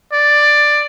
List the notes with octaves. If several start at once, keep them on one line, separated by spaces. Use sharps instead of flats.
D5